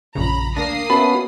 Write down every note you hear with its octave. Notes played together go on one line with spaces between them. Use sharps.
A#1 F#2 C#3 A#5 B5
D2 A#3 D4 D#6 A#6 C7
B3 C#4 F#4 E5 A5 B5